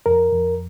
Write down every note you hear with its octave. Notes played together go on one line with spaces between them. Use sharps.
F2 A#4
F2